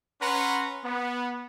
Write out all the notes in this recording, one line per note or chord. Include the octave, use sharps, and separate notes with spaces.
C#4 B4 F#5 A#5 C6
B3